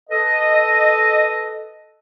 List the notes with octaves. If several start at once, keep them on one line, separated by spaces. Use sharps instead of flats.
A4 B4 D#5